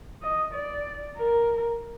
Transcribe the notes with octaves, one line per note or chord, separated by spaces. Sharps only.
D#5
D5
A#4